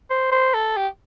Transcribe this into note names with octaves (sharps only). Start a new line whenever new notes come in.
C5
C5
A4
G4